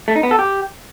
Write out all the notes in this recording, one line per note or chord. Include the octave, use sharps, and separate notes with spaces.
A3
D#4
B3
A4
G4